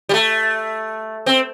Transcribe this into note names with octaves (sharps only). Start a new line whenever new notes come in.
G3
A3
C4